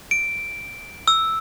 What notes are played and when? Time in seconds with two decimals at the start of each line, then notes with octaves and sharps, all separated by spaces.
0.11 D7
1.08 E6